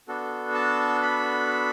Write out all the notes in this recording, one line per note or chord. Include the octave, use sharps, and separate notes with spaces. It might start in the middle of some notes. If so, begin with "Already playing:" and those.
B3 D4 F#4 A4
A5
B5